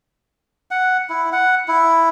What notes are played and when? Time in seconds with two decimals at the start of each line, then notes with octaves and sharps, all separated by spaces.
0.71 F#5
1.09 E4
1.33 F#5
1.68 E4